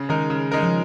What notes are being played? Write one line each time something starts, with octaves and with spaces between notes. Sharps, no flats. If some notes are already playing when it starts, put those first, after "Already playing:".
Already playing: C#3
D#3 G#3 D#4 A#4
C#3
G#3 D#4 A#4
F3